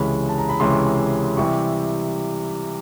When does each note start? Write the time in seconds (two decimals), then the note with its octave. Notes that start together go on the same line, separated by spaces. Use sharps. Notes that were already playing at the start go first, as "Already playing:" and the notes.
Already playing: C#2 C3 E3 G#3 C#4 B5
0.29 A5
0.38 A#5
0.49 B5
0.60 C#2 C3 E3 G#3 C#4 C6
1.37 C3 E3 G3 C#6